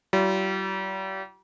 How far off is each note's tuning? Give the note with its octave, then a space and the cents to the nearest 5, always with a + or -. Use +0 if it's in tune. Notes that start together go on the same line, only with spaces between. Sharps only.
G3 -40 F4 -45